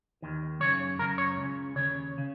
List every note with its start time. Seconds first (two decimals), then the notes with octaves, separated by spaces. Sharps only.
0.22 D#2 D#3
0.60 F#2 C#3 C#5
0.99 F#2 C#3 A#4
1.18 C#5
1.37 C#2 C#3
1.76 D#2 C#3 C#5
2.18 C#3